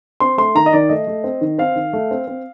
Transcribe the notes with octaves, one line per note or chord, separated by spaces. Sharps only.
C4 C6
A3 C6
D#3 A#5
D#5
D#3 D5
A3 D#5
A3
C4
D#3
C4 F5
D#3
A3
C4
C4